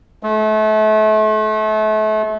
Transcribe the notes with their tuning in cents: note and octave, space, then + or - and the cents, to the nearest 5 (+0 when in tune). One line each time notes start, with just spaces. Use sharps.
A3 -35